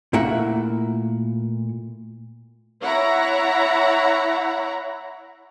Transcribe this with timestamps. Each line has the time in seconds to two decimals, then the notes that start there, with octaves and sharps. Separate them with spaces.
0.13 A#2 A3 A#3 E4 E5 F#5
2.82 E4 C#5 F#5 A#5